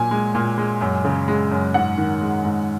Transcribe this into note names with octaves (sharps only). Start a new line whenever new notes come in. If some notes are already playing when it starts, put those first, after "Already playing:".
Already playing: A#2 F#3 G#5
G#3
A#2
G#3
F#2
C#3
G#3
F#2
G#2 F#5
D#3
G#3
G#2